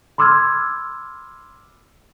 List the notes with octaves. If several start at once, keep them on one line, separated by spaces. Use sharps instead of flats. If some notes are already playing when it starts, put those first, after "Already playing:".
B5 C6 D6 E6 F6 G#6